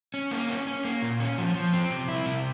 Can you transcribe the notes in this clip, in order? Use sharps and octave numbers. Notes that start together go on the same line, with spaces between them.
C#4
A#3
C#4
C#4
A#3
A#2
C#4
F3
F3
C4
C3
E4
C3